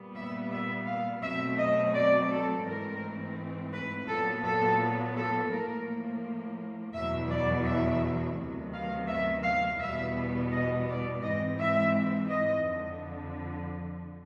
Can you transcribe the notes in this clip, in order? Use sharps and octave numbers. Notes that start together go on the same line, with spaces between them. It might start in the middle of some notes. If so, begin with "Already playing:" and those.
Already playing: A#2 G3 B3
E5
E5
F5
B2 F#3 A3 C4 E5
D#5
D5
A4
G#2 E3 A3 C4 A#4
B4
A#2 F#3 B3 A4
A4
A4
A2 F3 A#3 A#4
E2 B2 F#3 E5
D5
E5
D2 C3 D#3 F#3 B3
F5
E5
F5
E2 B2 G3 B3 E5
D#5
D5
G#2 E3 G#3 C4 D#5
E5
D#5
F2 D3 F3